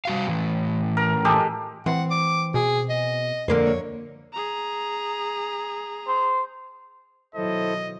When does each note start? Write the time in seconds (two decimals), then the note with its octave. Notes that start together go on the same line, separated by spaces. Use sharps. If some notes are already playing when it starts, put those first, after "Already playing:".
0.05 G3 F#4 F5
0.28 A2 E3
0.97 A#4
1.25 G#3 G4 A4
1.86 E3 C4 F#5
2.11 D6
2.54 B2 G#4
2.89 D#5
3.48 F2 D3 A#3 C5
3.65 C#5
4.33 G#4 A#5
6.08 C5
7.35 B2 D#3 F#3 E4 A4 C5 D#5